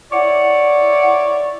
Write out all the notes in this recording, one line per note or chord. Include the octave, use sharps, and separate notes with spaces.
E4 C#5 D5 F#5